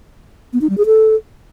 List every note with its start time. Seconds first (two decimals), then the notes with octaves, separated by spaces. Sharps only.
0.53 B3
0.61 D#4
0.70 G3
0.78 G#4
0.86 A4